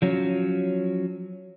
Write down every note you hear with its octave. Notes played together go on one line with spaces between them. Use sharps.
F3 F#3 C#4